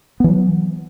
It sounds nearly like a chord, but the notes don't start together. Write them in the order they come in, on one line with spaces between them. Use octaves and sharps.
B3 E3 F#3